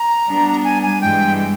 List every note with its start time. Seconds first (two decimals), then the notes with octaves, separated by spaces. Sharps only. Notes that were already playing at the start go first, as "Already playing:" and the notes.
Already playing: A#5
0.28 G3 B3 D4
0.64 G#5
0.82 G#5
1.01 G2 E3 G#3 G5
1.37 G5